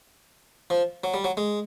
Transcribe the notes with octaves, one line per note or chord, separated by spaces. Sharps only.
F3
F#3
G3
F#3
G#3